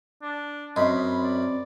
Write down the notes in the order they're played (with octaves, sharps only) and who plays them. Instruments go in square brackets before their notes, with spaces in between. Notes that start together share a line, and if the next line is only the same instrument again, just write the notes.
[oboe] D4
[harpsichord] F#2 [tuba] C4 [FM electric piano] D#5 B5 [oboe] C6
[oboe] D5